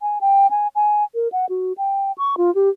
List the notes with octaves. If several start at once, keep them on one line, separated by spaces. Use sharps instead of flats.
G#5
G5
G#5
G#5
A#4
F#5
F#4
G5
C#6
F4
G4